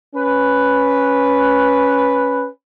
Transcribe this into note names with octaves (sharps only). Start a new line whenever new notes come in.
C#4 B4